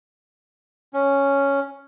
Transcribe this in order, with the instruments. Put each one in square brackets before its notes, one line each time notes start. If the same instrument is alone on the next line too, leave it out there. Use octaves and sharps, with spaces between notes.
[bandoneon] C#4